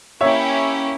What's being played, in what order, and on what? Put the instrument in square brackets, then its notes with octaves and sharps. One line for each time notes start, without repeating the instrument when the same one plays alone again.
[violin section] A#3 C#4 E4 G4 [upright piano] C#5 E5